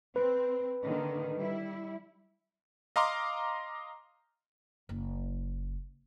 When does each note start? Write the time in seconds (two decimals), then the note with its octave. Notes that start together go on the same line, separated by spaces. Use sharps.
0.16 C4 B4
0.83 D3 D#3 A#3
1.35 G3 E4
2.96 D#5 F5 A#5 C6 D6
4.89 F#1